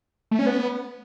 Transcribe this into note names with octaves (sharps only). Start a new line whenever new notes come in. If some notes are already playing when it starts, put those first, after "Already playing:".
A3
C#4
B3